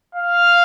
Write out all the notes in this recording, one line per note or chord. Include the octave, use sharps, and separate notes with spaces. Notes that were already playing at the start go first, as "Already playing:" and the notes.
F5